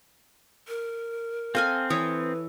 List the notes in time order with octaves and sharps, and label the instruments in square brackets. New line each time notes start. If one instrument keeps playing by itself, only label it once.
[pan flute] A#4
[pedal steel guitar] C4 [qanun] A4 D#5 G#5 [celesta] F5 F6
[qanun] E3 E4 C#5 [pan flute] B4 [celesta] D#6